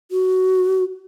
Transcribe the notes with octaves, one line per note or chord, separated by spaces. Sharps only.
F#4